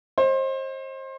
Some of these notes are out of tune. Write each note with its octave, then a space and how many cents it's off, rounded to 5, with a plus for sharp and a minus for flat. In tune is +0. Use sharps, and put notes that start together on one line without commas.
C5 +30 D#5 +10